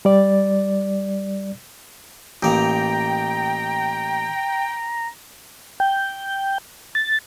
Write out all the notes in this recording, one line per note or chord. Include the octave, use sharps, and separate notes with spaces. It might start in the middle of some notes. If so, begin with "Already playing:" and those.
G3 D5
A1 A#3 G5 A#5
G5
A6